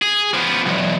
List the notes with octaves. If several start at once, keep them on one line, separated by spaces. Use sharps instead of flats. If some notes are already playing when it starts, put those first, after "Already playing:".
G#4
F3 B3
B1 E2